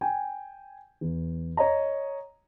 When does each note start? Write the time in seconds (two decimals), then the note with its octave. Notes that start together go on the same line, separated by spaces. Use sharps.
0.01 G5 G#5
1.01 E2
1.57 C#5 D#5 A#5